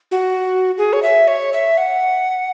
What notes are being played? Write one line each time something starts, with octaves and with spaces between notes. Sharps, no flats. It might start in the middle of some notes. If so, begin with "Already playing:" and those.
F#4
G#4
C#5
E5
C#5
E5
F#5